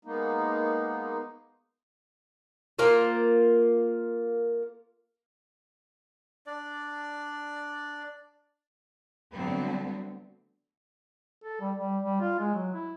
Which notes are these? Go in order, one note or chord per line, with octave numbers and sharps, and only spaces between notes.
G#3 A#3 B3 D#4
A#3 F4 C5
D4 D5
D3 F#3 G3 A3 B3 C4
A4
G3
G3
G3
F4
G#3
F#3
E4